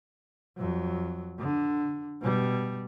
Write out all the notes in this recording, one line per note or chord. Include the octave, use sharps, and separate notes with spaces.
F2 F#3
D3
B2 G3